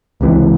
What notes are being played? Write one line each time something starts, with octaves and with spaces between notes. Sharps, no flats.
C#2 C3 E3